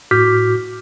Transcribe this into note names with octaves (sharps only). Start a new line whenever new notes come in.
A2 F#4 D6 F6 G6 B6